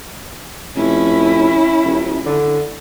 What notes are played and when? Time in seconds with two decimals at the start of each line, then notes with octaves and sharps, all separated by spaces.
0.75 F1 C#4 E4
1.84 D#1
2.26 D3